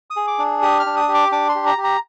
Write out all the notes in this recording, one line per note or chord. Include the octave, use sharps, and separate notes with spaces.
D#6
G#4
D6
D4
G4 D#6
F6
D4
D#6
G4
D6
D4 D6
C6
G4
A#5
G4
A#5